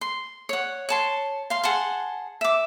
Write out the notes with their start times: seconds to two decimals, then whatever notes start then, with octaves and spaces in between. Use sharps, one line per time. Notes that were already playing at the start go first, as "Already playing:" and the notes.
0.01 C6
0.49 C#5 F#5
0.89 C#5 A5 C6
1.50 F5 C6
1.64 G#4 F#5 A5 C6
2.41 E5 D6